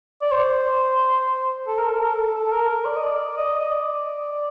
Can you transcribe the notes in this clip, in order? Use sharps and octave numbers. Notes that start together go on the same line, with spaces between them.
D5
C5
A4
A#4
A4
A#4
A4
A4
A#4
A#4
D5
D#5
D5
D#5
D#5
D5